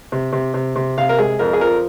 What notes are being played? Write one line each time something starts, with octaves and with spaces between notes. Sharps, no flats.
C3
C3
C3
C3
C3 F5
A#4
G#3 G#4
F2 A#4
G#4
F3 A#4